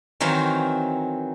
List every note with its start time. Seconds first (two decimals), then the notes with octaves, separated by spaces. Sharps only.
0.20 D#3 E3 F#3 C4 F5